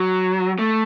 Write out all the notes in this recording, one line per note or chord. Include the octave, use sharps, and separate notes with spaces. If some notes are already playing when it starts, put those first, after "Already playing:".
Already playing: F#3
A3